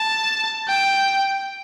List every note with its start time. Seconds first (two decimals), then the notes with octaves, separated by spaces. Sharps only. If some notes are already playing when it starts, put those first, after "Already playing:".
Already playing: A5
0.68 G5